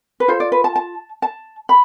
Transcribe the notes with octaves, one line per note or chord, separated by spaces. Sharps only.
B4
F4 A4 C5
D5
B4
A5
A5
A5
B5